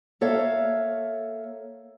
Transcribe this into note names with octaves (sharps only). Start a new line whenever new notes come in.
A#3 A4 C#5 E5 F5